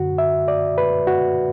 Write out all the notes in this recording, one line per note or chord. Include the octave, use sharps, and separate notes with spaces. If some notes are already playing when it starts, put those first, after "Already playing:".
Already playing: F#2 D3 F#4
E5
D5
B4
F#4